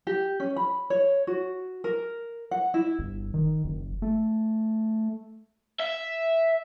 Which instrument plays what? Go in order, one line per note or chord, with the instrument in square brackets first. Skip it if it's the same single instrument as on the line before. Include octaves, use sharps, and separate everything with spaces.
[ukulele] G4
C#4
B5
C#5
F#4
A#4
F#5
E4
[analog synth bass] G1
D#3
F#1
A3
[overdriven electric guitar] E5